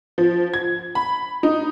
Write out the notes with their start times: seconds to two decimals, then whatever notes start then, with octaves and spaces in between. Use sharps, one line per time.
0.18 F3
0.54 G#6
0.95 B5
1.43 D#4